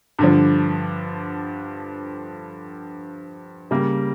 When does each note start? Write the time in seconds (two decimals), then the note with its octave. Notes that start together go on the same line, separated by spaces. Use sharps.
0.19 G2 D3 F3
3.71 C#3 G3 A#3